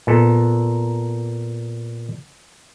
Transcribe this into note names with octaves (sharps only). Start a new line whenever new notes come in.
A#2 B3 A4